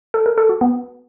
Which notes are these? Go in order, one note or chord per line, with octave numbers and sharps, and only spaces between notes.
A4
A#4
A4
F#4
B3